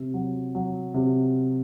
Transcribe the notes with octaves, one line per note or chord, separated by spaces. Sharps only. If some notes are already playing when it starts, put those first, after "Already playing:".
Already playing: C3
F#3
F#3
C3